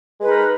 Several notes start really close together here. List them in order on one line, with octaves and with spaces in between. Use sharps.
G#3 B4 D#4 A#4